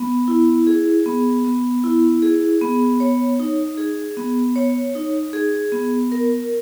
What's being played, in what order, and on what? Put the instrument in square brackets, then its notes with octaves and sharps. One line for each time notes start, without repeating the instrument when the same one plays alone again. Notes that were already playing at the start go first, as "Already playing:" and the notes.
Already playing: [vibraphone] B3
E4
G#4
B3
B3
E4
G#4
B3
C#5
D#4
G#4
B3
C#5
D#4
G#4
B3
A#4